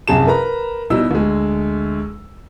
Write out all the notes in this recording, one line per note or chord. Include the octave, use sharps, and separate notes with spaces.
C2 F#2 G#4 A5 E7
A#4 B4 A#5
B2 G3 D#4 E4 E6
D2 G#3